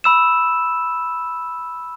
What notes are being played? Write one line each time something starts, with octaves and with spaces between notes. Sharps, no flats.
B5 E6 E7